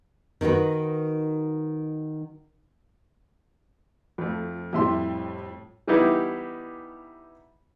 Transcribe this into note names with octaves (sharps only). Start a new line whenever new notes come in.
D#3 D#4 F#4 B4
F2 F3 A3
F2 A2 G3 G4 E5 C6
E3 G3 B3 D#4 E4 G4